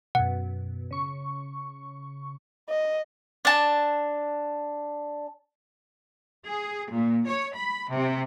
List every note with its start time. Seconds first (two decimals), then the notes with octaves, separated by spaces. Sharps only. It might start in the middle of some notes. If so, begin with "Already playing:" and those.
0.15 F#2 B2 F#5
0.91 C#3 C#6
2.69 D#5
3.45 D4 A5
6.45 G#4
6.92 A#2
7.24 C#5
7.56 B5
7.91 C3